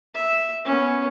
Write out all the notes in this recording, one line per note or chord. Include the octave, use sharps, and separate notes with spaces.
E5
B3 C#4